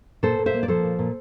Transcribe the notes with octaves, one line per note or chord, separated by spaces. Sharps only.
A#2 A4 C5
A#2
C5 E5
A#3
D5
F3 A4 C5
A#2
A#2